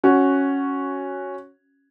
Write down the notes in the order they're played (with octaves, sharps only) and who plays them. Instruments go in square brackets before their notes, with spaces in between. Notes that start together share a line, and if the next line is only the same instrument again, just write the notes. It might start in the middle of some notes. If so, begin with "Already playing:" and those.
[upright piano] C#4 F#4